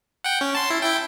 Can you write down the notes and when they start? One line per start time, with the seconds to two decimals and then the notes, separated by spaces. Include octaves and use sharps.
0.24 F#5 G5
0.41 C#4
0.55 A5 C6
0.70 E4
0.82 E4 G5